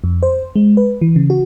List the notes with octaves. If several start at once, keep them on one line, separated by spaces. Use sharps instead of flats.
F2
C5
G#3
B4
E3
C#3
F#4